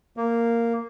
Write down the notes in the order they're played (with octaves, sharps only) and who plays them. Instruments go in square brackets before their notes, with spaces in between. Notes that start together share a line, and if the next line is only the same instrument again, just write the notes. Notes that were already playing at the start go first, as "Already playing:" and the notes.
[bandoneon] A#3